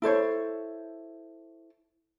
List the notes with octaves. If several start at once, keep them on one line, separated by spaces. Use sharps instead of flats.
E4 A4 C5 C#5